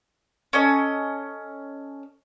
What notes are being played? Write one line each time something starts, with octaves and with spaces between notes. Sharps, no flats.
C#4 A4 D#5